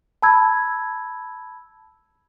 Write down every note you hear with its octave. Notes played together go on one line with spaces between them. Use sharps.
A5 B5 E6 G#6